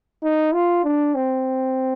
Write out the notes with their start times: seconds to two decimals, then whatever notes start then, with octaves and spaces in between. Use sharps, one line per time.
0.23 D#4
0.54 F4
0.84 D4
1.15 C4